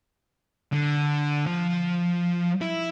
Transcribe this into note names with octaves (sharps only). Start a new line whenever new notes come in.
D3
F3
E4